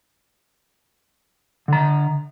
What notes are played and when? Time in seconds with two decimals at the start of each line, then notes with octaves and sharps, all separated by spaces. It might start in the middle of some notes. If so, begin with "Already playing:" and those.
1.68 D3 A#5